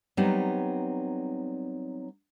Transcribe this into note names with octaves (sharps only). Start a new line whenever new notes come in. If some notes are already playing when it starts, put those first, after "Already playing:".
F#3 G3 B3 C4 D#4